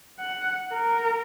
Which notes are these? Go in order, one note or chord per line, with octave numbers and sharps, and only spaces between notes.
F#5
A#4